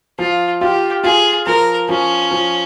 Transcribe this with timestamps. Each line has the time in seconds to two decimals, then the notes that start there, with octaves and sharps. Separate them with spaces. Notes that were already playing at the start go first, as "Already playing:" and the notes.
0.19 F3 F4
0.61 F4 G4
1.04 F4 G#4
1.46 F3 A#4
1.89 F3 C#4
2.31 F3